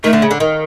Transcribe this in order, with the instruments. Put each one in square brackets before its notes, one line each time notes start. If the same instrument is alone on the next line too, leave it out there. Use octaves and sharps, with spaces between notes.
[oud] D#3 [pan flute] A3
[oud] D3
C#3
D3
D#3